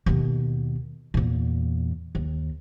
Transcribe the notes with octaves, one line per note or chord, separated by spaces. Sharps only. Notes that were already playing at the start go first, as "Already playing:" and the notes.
D#2 B2
E2 A#2
D#2